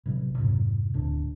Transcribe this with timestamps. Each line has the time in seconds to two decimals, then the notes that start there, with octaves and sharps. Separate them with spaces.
0.06 A1 C3 F#3
0.38 F2 G#2 C3
0.94 D1 D2 A2 D4